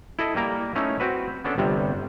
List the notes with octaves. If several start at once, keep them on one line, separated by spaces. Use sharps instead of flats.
E4 A4 D#5
G3 A#3 A#4
A3 C#4 D#4 E4
C4 F#4 B4
B3 C#4 D4 A4
G1 C3 G3